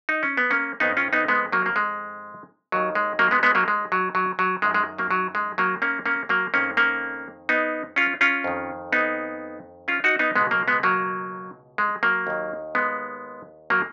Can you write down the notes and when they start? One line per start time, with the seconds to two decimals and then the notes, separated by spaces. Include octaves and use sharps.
0.09 D#4
0.23 C#4
0.37 B3
0.51 A#3 C#4
0.80 F2 D#3 B3 D#4
0.97 C#4 F4
1.13 B3 D#4
1.28 G#3 B3
1.52 F#3 A#3
1.66 A#3
1.76 G#3
2.72 D#2 D#3 F#3
2.95 G#3
3.19 F#3 A#3
3.31 G#3 B3
3.43 G#3 B3
3.55 F#3 A#3
3.68 G#3
3.92 F#3
4.15 F#3
4.39 F#3
4.62 F#2 D#3 G#3
4.74 G#3
4.98 F#3 A#3
5.11 F#3
5.35 G#3
5.58 F#3 A#3
5.82 A#3 C#4
6.06 A#3 C#4
6.29 F#3 A#3
6.54 F2 D#3 A#3 C#4
6.77 A#3 C#4
7.49 B3 D#4
7.96 C#4 F4
8.21 C#4 F4
8.44 F2 D#3
8.92 B3 D#4
9.88 C#4 F4
10.04 D#4 F#4
10.19 B3 D#4
10.36 C#2 B2 G#3 B3
10.51 F#3 A#3
10.68 G#3 B3
10.83 F#3 A#3
11.78 G#3
12.03 F#3 A#3
12.27 D#2 D#3
12.75 G#3 B3
13.70 F#3 A#3